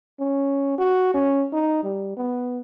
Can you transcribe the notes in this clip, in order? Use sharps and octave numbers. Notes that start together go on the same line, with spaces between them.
C#4
F#4
C#4
D#4
G3
B3